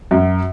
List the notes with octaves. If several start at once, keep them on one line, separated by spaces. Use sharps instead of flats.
F#2